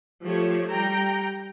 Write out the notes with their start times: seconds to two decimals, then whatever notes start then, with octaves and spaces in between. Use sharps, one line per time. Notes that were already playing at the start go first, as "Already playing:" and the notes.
0.24 F3 A3 G4 C#5
0.70 G3 G5 A#5